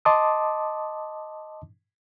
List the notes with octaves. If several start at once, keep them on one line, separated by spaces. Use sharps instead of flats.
D#5 A5 C6 D6 D#6